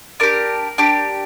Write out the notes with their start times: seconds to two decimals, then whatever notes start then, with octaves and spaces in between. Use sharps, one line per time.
0.20 D4 G4 A#4
0.78 D4 G4